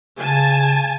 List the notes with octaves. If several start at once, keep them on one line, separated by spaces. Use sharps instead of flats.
C#3 G#5 A5